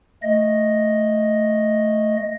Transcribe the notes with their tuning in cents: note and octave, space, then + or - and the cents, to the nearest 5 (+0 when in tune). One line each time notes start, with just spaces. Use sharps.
A3 +0 D#5 +0